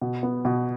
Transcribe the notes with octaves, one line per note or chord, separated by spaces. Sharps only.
B2
B3
B2